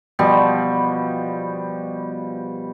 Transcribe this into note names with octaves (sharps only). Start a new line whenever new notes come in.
B2 F3 G3